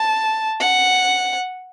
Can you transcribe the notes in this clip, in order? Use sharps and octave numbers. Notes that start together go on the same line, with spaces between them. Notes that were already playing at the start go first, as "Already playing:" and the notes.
Already playing: A5
F#5